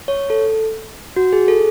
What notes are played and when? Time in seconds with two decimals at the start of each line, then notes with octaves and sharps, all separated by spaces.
0.08 C#5
0.30 A4
1.16 F#4
1.33 G#4
1.48 A4